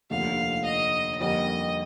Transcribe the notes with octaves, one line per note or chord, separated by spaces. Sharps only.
F1 D#2 D3 F3 A3 F5
D#5
F2 D3 G3 A#3 D#4 D#5